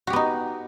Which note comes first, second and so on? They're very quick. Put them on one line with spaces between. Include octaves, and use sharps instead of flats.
F#4 G4 B3 D#4